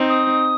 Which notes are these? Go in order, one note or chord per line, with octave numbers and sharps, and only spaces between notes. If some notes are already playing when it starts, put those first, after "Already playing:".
Already playing: C4 D#4
D#6